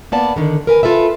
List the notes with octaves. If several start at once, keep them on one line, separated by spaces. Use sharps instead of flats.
A#3 B3 D5 A5
D3 D#3
A#4 B4 G#5
F4 A4 B4 E5